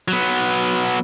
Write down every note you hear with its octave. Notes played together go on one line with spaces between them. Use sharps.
F#3 B3